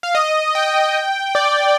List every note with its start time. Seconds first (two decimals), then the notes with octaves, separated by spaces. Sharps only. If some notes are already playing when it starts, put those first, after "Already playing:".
0.03 F5
0.15 D#5
0.55 G5
1.35 D5